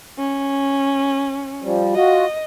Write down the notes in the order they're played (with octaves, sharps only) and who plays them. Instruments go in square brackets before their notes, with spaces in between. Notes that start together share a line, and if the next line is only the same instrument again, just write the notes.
[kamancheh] C#4
[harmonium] F3 G3
[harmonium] F4 F#4 [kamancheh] D#5